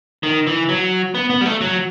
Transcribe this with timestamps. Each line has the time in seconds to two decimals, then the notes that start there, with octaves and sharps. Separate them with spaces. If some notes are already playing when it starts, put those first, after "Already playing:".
0.23 D#3
0.47 E3
0.69 F#3
1.15 B3
1.30 B3
1.41 G3
1.46 A3
1.61 F#3